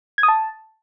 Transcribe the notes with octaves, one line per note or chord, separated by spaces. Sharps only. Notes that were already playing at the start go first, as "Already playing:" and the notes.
G#6
D#6
A5